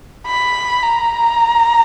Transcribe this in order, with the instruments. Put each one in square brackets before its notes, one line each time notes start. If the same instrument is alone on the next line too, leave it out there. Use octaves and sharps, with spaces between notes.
[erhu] B5
A#5